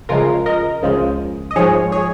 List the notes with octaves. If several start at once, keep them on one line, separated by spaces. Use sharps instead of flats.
C#2 C#3 F3 G#3 F4 A#4
A#4 D#5
C#2 C#3 F3 G#3
D#5
G#2 F3 G#3 G#4 C#5
G#4 C#5